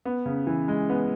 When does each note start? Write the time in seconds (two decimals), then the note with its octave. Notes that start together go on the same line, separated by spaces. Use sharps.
0.05 B3
0.26 C#3
0.47 E3
0.68 G#3
0.90 B3